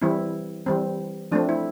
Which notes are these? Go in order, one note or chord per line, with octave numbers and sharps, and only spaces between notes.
E3 G3 C4 E4
E3 G3 C4
F3 A3 C4 D4
E4